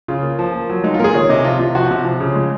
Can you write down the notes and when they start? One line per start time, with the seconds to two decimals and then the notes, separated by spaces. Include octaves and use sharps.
0.08 C#3 F4
0.23 A#3
0.39 F3
0.54 A#3
0.69 F#3
0.84 G#3 D#4
0.94 F4
0.99 A#2 A#4
1.04 G#4
1.14 D#3 C#5
1.29 C3 D#5
1.44 F3 F4
1.59 C3 F4
1.75 F3 F#4
1.91 C3
2.05 F3
2.20 C#3
2.35 G#3